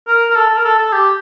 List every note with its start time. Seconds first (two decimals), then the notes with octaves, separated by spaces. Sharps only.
0.08 A#4
0.30 A#4
0.36 A4
0.50 A4
0.57 A#4
0.65 A4
0.78 A4
0.93 G4